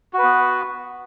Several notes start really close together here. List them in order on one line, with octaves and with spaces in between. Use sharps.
F#4 B4 B3